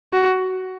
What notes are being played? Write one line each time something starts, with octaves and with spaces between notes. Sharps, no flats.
F#4